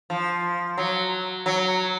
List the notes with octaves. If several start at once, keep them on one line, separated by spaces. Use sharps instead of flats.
F3
F#3
F#3